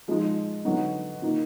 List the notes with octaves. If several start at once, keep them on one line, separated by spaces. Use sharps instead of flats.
F3 G#3 D#4
D3 F#3 B3 D#4
D#3 A#3 D#4